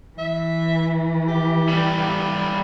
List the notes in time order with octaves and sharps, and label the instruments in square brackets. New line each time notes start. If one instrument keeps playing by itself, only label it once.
[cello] E3 [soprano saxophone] E5
[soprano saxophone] G4
[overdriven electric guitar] G3 B3